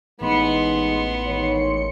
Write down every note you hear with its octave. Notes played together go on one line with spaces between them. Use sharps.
A1 G#3 B3 C#4 D#4 C6 C#7
G#2 D#3 C#5